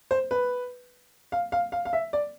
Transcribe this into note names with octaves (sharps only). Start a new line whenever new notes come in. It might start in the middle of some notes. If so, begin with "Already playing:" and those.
C5
B4
F5
F5
F5
F5
E5
D5